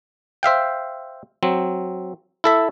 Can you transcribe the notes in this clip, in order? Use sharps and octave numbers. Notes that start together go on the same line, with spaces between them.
C5 E5 F5 G5
F#3 C4
E4 A4 E5